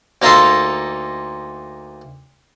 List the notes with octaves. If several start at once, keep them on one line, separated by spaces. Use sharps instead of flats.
D2 A#3 D#4 F4 A4 C6